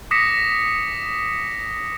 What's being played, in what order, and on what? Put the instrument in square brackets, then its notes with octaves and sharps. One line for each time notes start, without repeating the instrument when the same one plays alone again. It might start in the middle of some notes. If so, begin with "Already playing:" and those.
[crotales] D6 D#6 A#6 B6 C#7 E7